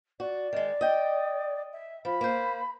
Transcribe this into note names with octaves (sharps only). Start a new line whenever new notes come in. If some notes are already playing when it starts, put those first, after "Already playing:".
F#4 D5
D#3 G#3
D#5 G5
E5
F3 B5
A#3 C5